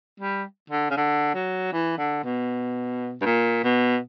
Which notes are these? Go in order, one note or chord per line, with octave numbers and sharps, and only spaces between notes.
G3
D3
C#3
D3
F#3
E3
D3
B2
G2
A#2
B2